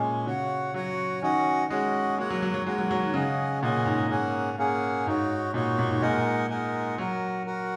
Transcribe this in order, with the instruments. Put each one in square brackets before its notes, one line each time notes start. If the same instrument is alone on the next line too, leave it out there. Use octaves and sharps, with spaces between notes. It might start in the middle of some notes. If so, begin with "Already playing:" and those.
Already playing: [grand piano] A#2 [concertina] G#3 C#4
[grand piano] C#3 [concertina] F#4 C#5 F#5
[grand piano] F#3 [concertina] F#4 C#5 F#5
[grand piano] D#3 [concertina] C#4 F#4 D#5 F#5
[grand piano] G#3 [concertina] C#4 F#4 D#5 F#5
[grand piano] G#3 [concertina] A#3 F#4 C#5 F#5
[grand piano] F#3
F#3
F#3
[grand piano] G#3 [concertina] A#3 F#4 C#5 F#5
[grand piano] F#3
F#3
D#3
[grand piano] C#3 [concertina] C#4 G#4 D#5 F#5
[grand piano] A#2 [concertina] C#4 G#4 D#5 F#5
[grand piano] G#2
[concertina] A#3 C#4 G#4 F#5
A#3 C#4 G#4 F#5
[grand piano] G#2 [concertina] D#4 F#4 C#5
[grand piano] A#2 [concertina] D#4 F#4 C#5
[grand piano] A#2
G#2
[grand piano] A#2 [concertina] G#3 D#4 A#4 D#5 F#5
[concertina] G#3 D#4 A#4 D#5 F#5
[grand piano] F#3 [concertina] F#4 A#4 F#5
[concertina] F#4 A#4 F#5